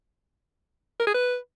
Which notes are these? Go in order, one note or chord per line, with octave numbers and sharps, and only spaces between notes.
A#4
G#4
B4